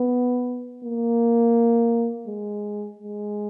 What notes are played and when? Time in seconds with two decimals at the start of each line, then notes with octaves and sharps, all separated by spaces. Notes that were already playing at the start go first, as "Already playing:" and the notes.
Already playing: B3
0.85 A#3
2.28 G#3
2.99 G#3